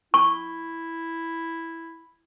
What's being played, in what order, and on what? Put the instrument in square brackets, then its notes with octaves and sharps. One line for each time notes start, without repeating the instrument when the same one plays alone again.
[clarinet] E4 [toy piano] C#6